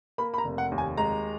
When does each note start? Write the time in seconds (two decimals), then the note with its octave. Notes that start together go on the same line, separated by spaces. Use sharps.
0.18 A#3 B5
0.34 B5
0.38 A#5
0.44 F1
0.58 F#5
0.72 D#2
0.78 G#5
0.97 G#3 A#5